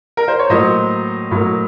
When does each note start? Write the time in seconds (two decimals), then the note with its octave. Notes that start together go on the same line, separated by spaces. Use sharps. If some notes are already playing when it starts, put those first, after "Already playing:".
0.17 A#4
0.28 C5
0.39 C#5
0.50 A2 F#3 A#3 C5 D#5
1.31 A2 F#3 A#3